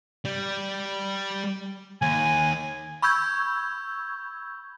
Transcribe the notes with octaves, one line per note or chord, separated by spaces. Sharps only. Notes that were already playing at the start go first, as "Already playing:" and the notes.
G3
D#2 G#5
B5 C#6 E6 G6 G#6